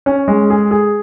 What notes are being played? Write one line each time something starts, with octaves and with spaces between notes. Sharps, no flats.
C#4
G#3
G#4
G#4